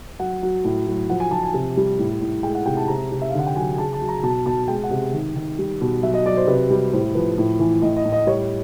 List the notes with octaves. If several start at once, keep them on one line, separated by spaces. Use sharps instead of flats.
F#3 F#5
F#3
A2
F#3
F3 F#5
G#5
F3 A5
G#5
C3
G3
A2
A2
G#3 G5
F#5
C3 G5
A5
C3 A#5
C3
E5
F5
D3 F#5
G5
F#3 G#5
G#5
C#3 A5
A5
F#3
A#5
B2 A5
B2 A5
G#3 G5
F#5
C3
D#3
D#3
G3
B2
F#3 E5
D#5
F#3 D5
C5
C3 B4
G3
A2 C5
F3 B4
A2
E3
A2 D#5
D#5
A2
D#5
G3 C#5